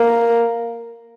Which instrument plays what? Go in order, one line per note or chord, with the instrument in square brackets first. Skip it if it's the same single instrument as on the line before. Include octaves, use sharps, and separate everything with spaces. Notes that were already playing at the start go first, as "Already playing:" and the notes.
Already playing: [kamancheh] A#3